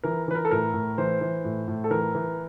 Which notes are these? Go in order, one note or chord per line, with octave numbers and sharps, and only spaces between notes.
E3 A#4
E3 B4
A#4
A4
A2 A#4
A2
E3 C5
E3
A2
A2
A4
E3 A#4
E3